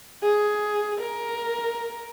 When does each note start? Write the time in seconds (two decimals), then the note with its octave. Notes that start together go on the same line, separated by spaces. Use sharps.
0.23 G#4
1.00 A#4